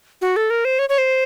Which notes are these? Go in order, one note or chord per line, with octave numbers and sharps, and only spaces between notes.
F#4
A4
A#4
C5
C#5
C#5
C5